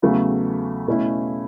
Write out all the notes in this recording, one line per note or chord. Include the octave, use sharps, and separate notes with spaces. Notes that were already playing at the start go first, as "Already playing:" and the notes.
E2 C#3 F#3 A3
B2 A3 C#4 E4